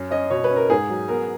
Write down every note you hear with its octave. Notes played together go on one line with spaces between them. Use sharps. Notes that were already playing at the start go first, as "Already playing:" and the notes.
Already playing: F#2 C#4
C#4 D#5
B2 C#5
B4
C#4
A#4
G#2 G#4
F#3
B3 A#4